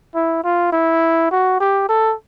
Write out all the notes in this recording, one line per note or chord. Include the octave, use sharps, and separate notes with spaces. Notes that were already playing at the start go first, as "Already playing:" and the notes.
E4
F4
E4
F#4
G4
A4